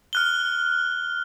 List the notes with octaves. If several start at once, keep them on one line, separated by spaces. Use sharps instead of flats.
F6 F#6 G7